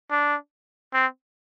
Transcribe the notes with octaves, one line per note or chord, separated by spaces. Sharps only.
D4
C4